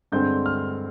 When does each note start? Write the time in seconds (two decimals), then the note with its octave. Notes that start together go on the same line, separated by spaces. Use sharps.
0.12 G2 D3 G#3 C4 G6
0.46 F6